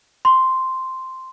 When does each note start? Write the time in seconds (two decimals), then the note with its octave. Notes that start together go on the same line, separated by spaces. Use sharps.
0.25 C6